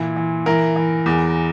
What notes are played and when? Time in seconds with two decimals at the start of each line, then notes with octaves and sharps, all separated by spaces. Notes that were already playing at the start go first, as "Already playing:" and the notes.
Already playing: A#2 E3
0.16 E3
0.46 E3 A#4
0.76 E3
1.06 E2